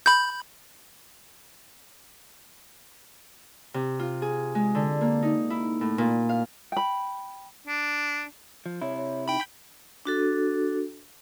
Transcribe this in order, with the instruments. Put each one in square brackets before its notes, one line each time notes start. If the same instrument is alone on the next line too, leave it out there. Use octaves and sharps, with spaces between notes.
[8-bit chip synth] B5 G6
[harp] C3
F4
G#4
G#3
D3
A#3
D#4
E4
A2
A#2
F5
[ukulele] G5 B5
[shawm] D4
[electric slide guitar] F3
[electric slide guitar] C3 E4 [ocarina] C#5
[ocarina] C#5
[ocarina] D#4 [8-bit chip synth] G5 B5
[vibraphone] D4 F#4 A4